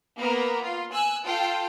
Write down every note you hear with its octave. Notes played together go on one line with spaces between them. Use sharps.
A#3 B3 A#4 A#5
F4
G#5 E6 F#6
F4 A4 G5